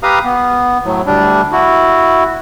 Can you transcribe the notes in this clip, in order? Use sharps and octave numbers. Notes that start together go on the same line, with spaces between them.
G4 B4 F5 A#5 D#6
B3
A2 F#3
D2 G3 D4
E4 F#4